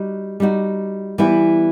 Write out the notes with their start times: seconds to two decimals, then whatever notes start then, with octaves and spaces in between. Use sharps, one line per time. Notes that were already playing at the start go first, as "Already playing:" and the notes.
Already playing: G3 D#4 F#4
0.40 G3 D#4 F#4
1.18 E3 G3 B3 E4